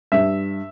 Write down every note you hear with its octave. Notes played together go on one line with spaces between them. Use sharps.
G2 E5